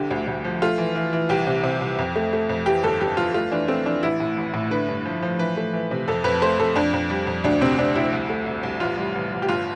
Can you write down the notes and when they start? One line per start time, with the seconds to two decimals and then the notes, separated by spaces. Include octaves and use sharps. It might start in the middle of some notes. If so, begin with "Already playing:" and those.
Already playing: C2 D3 G4
0.11 D2
0.27 D2
0.44 F3
0.62 A3 F4
0.78 E3
0.95 E3
1.13 E3
1.29 C2 G4
1.47 C3
1.63 C3
1.81 C2
1.98 F2
2.16 A3
2.33 A3
2.49 F2
2.66 E3 G4
2.84 G1 A4
3.01 G1 G4
3.17 G1 F4
3.34 A3 F4
3.52 E3 D4
3.68 A3 C4
3.86 E3 D4
4.03 A1 E4
4.20 A2
4.37 A1
4.54 A2
4.71 D3 B4
4.88 G2
5.05 F3
5.22 F3
5.39 E3 B4
5.57 A3
5.73 E3
5.91 C3
6.08 F2 A4
6.24 F2 B4
6.42 A3 C5
6.59 F2 A4
6.76 F2 D4
6.93 F2
7.10 G3
7.27 F2
7.44 D2 D4
7.61 C3 C4
7.78 C3 D4
7.95 D2 E4
8.13 C2
8.29 A3
8.46 C2
8.63 C2
8.80 A1 F4
8.98 G3
9.15 A1
9.32 A1
9.42 G4
9.48 G1 F4